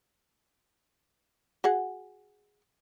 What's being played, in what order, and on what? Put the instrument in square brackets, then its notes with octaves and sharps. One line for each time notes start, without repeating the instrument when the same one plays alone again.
[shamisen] F#4 G#4 F#5